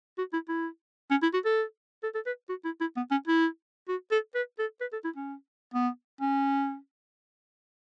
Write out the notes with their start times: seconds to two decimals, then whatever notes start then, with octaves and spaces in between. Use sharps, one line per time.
0.18 F#4
0.33 E4
0.49 E4
1.11 C#4
1.22 E4
1.34 F#4
1.45 A4
2.03 A4
2.15 A4
2.26 B4
2.49 F#4
2.65 E4
2.81 E4
2.97 B3
3.11 C#4
3.27 E4
3.88 F#4
4.11 A4
4.35 B4
4.59 A4
4.81 B4
4.92 A4
5.04 E4
5.16 C#4
5.74 B3
6.21 C#4